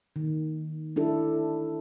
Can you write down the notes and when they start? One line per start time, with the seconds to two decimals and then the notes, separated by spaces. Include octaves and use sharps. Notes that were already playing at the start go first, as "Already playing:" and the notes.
0.16 D#3
0.96 D4 E4 A4